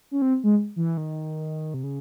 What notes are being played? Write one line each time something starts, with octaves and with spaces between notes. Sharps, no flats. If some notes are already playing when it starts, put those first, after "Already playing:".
C#4
C4
G#3
E3
D#3
C3
C#3